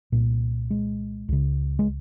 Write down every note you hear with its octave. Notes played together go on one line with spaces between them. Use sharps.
C2 A#2
G#3
C#2 C#3
G#3